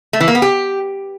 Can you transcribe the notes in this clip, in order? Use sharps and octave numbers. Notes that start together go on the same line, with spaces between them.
A3
E3
A#3
B3
G4